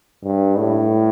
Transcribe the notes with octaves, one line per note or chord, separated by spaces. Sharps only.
G2
A2